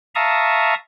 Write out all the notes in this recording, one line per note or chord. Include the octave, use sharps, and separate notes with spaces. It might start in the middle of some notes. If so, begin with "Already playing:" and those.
E5 F5 A5 A#5 C#6 D#6